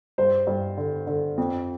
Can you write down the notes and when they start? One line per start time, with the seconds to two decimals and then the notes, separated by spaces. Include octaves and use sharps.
0.18 G2 C5
0.47 G2
0.77 D3
1.07 D3
1.38 F2